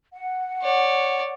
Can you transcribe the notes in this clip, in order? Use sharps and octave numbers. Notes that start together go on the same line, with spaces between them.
F#5
C#5 D5